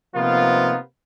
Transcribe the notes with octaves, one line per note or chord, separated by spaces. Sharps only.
C3 F3 A#3 B3 D#4 F4